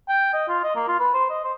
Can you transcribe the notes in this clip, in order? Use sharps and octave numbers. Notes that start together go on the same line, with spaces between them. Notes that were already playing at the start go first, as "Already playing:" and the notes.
G5
D#5
F4
D#5
A#3
F4
B4
C5
D#5
C5